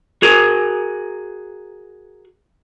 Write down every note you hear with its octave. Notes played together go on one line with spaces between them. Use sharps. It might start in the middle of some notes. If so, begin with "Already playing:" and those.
F#4 G#4 A#4